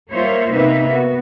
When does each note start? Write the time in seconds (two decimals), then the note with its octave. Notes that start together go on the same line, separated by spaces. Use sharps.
0.11 G3 A#3 F4 C5 C#5 E5
0.52 C3 A#3 B3 D#4 B4 E5
0.88 B3 F#4